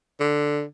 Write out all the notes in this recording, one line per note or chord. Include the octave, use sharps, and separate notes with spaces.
D3